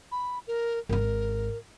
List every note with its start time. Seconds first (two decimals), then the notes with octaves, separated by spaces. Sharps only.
0.12 B5
0.47 A#4
0.89 G#1 G#2 A#4